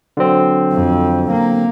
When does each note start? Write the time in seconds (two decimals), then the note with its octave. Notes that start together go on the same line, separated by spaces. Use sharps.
0.17 D3 F#3 C4
0.72 F2
1.32 A#3